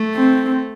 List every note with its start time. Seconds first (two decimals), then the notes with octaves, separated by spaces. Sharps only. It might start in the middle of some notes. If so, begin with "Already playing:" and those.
Already playing: A3
0.15 C4